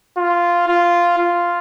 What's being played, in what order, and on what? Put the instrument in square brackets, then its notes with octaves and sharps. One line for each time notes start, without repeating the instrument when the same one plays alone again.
[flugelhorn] F4
F4
F4